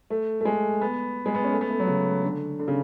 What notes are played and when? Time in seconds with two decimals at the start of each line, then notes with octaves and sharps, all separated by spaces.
0.10 A3
0.41 A3
0.45 G#3
0.81 B3
1.26 G#3
1.35 B3
1.44 C#4
1.52 A3
1.61 B3
1.70 A3
1.80 F#3
1.87 C#3
2.24 D3
2.59 D3
2.68 C#3